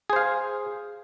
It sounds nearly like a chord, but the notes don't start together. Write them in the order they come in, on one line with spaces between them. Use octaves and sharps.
G#4 C5 F5